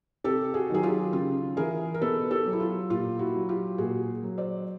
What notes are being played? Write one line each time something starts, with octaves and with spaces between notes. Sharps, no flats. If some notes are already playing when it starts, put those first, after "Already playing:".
C3 G4 A4
F#4 G#4
D#3 F#3 G#4
F4 G4
C#3 F4
E3 G#4 A#4
A#4
B2 A4 B4
G4 A4
F#3
E4
F4
A#2 F4 G4
E4 F#4
F#3
F4 G4
A#2 F#4 G#4
F#3
C5 D5